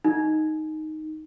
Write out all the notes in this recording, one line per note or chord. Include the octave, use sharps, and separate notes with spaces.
D#4